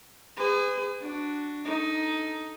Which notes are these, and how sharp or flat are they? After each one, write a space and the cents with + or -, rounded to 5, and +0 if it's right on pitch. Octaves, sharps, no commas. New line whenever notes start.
G#4 -25 B4 +40
D4 +0 F#4 +0
D#4 +10 A4 +0